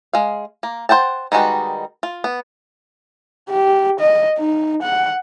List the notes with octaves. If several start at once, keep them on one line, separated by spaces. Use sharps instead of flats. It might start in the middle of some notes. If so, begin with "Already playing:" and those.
G#3 F5
A#3
C5 F#5 G5 A5
D#3 G3 G#3 F#4 B4
F4
B3
G4
D#5
D#4
F#5